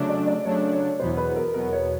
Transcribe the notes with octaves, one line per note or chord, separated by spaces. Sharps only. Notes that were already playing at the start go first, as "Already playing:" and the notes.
Already playing: C#3 F#3 A3 D4
D5
D5
C#3 F#3 A3 D4 C#5
C#5
E2 B2 F#3 B3 C5
B4
A#4
E2 B2 F#3 B3 A#4
C#5